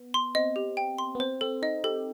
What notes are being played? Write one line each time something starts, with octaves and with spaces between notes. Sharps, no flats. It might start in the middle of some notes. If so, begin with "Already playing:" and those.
Already playing: B3
C6
C4 D#5
G4
G5
C6
B3
C4 C5
C4 A4
D#4 D#5
G4 A4